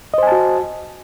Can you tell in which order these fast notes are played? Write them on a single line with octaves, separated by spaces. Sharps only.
D#5 C5 G#5 A5 F#4